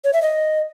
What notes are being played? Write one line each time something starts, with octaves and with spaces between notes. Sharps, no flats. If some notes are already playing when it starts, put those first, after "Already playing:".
C#5
E5
D#5